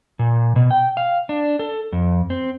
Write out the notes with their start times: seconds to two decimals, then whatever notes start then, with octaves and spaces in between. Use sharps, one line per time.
0.19 A#2
0.56 B2
0.71 G5
0.97 F5
1.29 D4
1.59 A4
1.92 F2
2.30 C4